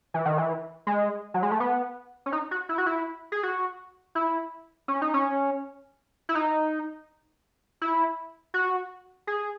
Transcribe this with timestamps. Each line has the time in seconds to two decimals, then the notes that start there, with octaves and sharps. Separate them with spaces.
0.14 E3
0.26 D#3
0.38 E3
0.87 G#3
1.34 F#3
1.43 G#3
1.51 A3
1.60 B3
2.26 C#4
2.33 D#4
2.51 F#4
2.69 E4
2.78 F#4
2.86 E4
3.32 G#4
3.43 F#4
4.15 E4
4.88 C#4
5.02 D#4
5.14 C#4
6.29 E4
6.35 D#4
7.82 E4
8.54 F#4
9.27 G#4